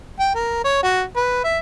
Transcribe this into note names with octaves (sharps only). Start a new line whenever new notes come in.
G5
A#4
C#5
F#4
B4
E5